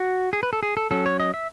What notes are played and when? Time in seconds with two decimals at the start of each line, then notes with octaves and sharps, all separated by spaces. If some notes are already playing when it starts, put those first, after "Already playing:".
Already playing: F#4
0.33 G#4
0.43 B4
0.53 A4
0.63 G#4
0.77 A4
0.91 F#3 C#4 A4
1.06 C#5
1.20 D#5
1.34 E5